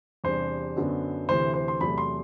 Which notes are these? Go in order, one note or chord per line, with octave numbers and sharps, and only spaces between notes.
E2 C3 G3 D4 C5
F#2 D3 F#3 B3 D4
D2 C3 E3 C5
C5
C6
E2 C3 F#3 A3 B5
C6